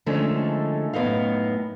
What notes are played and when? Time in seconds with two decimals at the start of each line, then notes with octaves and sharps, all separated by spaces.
0.06 D3 D#3 F3 G#3 A3 C#4
0.93 F#2 A2 F3 B3 D#4 F5